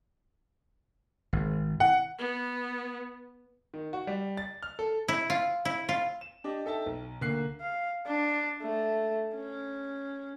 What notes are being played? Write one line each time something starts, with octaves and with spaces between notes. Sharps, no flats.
G#1
F#5
B3
D#3
F#4
G3
A6
F6
A4
E4
F4
E4
F4
E7
D4 G4 D#5
D#4 A4 E5 G5 A5
B1
D2 A#3 F#6 C7
F5
D4
A3
C#4